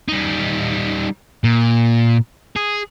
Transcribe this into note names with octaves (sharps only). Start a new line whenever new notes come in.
G3 D#4
A#2
G#4